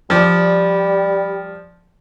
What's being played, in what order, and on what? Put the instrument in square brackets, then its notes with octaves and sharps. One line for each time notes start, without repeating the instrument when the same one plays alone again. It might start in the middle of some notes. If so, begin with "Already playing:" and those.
[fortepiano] F3 D5 [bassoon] G3